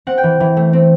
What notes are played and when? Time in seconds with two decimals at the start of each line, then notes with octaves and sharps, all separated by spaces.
0.07 C4 F#5
0.18 G5
0.23 E3
0.40 E3
0.57 A3
0.73 C4